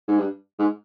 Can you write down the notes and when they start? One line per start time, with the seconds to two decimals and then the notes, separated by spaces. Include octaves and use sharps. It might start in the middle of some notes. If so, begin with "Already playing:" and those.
0.08 G#2
0.19 G2
0.59 G#2